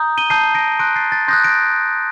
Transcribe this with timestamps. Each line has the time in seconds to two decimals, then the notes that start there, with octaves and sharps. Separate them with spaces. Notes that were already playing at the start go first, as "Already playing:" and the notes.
Already playing: A#5 D#6 G6
0.18 D#7 G7
0.30 A5 D#6 G6 C7 D#7
0.55 A#6 D7
0.79 C6 D#6 F#6 A#6 D7
0.96 A6 C7
1.12 A6
1.28 C6 D#6 F#6 G6 A#6
1.44 A#6 D7